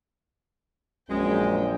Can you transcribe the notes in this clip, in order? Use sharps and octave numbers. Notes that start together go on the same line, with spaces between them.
A#1 F#2 G#3 C#4 G5